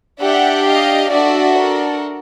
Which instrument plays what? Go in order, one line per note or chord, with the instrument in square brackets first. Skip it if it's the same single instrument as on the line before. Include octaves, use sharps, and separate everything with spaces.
[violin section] D4 G4 E5 F#5
D#5 F5
D4 F#4 A4 D5 E5
A#4